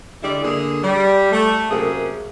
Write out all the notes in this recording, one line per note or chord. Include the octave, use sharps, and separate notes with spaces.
D3 G3 G#3 E4 D5
D3 A#3 G#4
G3
A3
F#2 C3 A#3 G#4